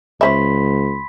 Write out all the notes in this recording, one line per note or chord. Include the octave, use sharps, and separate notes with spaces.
C#2 C#4 C5 E5 B5 C6 B6